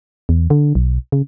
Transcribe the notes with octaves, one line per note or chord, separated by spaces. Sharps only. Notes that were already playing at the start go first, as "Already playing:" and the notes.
E2
D3
B1
C#3